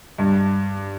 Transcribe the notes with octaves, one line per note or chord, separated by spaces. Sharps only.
G2